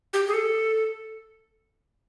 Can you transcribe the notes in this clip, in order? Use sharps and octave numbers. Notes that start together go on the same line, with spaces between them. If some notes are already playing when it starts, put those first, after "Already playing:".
G4
G#4
A4